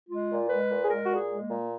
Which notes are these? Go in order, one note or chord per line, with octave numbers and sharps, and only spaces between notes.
G#3 F4
A#2
G#3 B4
A#2
G#4
G#3 A#4
F#4
A#2
G#4
G#3
A#3
A#2